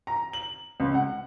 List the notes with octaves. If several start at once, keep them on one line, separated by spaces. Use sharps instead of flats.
A#5
F#7
C#2
F#5